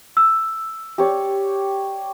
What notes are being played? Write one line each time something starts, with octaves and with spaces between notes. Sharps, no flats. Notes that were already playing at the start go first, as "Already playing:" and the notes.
E6
G4 C#5 D5